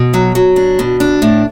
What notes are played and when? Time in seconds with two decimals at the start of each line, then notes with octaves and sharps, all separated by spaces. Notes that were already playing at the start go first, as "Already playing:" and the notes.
Already playing: B2
0.14 F#3
0.35 F#3
0.56 D4
0.79 B2
1.00 D4
1.22 A2